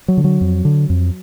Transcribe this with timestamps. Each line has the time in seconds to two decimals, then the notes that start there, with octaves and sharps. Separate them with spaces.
0.08 F#3
0.17 D3
0.24 F#3
0.41 F2
0.65 D3
0.90 F2